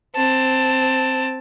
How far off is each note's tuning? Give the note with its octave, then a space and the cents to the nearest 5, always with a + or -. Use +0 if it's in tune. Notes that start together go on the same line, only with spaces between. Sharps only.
C4 +0 A5 +10